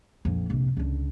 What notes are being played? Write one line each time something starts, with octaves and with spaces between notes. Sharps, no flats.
A#1 F2
A#1 C3
C#2 D3